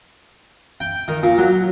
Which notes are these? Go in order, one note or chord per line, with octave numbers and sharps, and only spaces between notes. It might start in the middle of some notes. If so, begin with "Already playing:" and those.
G5
D#3
A#2
F#3